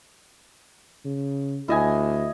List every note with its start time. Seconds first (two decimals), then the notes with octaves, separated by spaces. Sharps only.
1.05 C#3
1.68 D2 E4 D#5 G#5